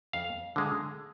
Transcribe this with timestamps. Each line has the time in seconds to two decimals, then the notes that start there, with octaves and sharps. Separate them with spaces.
0.13 F2 F5
0.56 D3 G#3